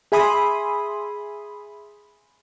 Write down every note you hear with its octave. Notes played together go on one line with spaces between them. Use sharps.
G#4 E5 G#5 B5 C6 D#6